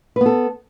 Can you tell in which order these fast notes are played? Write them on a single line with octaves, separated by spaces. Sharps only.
B4 B3 A4